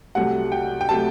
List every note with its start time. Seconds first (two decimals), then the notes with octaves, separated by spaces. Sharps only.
0.15 C2 C3 F#3 A3 F#5
0.52 G5
0.81 G5
0.89 C3 F#3 A3 A5